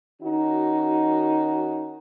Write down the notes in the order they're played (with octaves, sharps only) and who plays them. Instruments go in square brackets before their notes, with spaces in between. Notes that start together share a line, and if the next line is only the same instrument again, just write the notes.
[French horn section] D#3 C#4 D#4 F#4